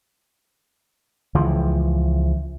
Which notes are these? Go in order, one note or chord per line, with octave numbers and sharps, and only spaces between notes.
C#2 E3 F3